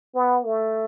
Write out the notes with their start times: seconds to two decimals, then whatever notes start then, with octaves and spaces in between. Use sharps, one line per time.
0.15 B3
0.45 A3